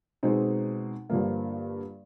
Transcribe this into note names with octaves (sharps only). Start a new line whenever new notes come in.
B2 G#3 C4 D#4
G2 D3 F3 A#3